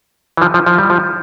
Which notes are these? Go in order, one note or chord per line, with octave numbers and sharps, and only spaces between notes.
E3
F3
F3
F3
G3
F3